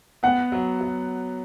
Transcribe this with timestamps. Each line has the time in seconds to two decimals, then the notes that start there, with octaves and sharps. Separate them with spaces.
0.23 B3 F#5
0.52 F#3
0.81 F#3